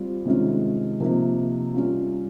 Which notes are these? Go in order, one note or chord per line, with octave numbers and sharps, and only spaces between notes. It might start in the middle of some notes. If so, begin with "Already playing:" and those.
Already playing: G3 C4 F4
C3 D#3 G#3 C#4 F4
C3 F3 A#3 D#4
G3 C#4 F4